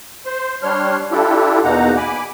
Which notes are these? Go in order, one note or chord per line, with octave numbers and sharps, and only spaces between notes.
C5 C6
G3 D4 C#5 C6 F6
D4 E4 F4 G4 A4
E2 B2 A#3 D#4 F#5 A#5
G#5 B5 D6